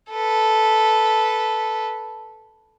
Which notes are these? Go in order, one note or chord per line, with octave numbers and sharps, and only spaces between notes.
A4 B4